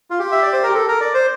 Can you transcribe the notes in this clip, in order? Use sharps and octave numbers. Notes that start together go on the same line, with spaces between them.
F4
G4
E5
D5
C5
A#4
A4
A#4
D5
C5